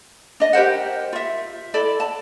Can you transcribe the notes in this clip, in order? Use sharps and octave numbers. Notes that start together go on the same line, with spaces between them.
D4 D#5
G4 A#4 C5 F#5
F4 E5
E4 A4 D5
A5